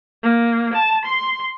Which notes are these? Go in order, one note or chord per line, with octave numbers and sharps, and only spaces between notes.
A#3
A5
C6